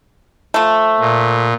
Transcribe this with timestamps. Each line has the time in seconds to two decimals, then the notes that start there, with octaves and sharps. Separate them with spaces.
0.54 F3 A3
1.00 A#2